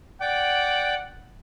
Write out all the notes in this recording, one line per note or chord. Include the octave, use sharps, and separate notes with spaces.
D5 F#5 G5 D6